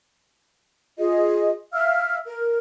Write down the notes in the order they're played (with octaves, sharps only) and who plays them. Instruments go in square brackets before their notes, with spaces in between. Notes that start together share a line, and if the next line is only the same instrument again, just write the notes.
[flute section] F4 G#4 D#5
E5 F5 E6 F6
A#4